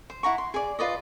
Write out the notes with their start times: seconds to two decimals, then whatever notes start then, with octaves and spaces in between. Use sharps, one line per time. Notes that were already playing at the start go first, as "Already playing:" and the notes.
0.10 C5
0.23 E4 F#5 A#5 C#6
0.38 C6
0.54 G#4 D5
0.79 F4 B4 D5 D#5